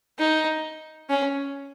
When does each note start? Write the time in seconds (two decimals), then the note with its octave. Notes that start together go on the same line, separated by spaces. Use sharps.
0.18 D#4
1.09 C#4